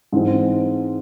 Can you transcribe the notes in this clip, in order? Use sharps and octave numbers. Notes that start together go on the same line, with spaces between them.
G#2 E3 G#3 C4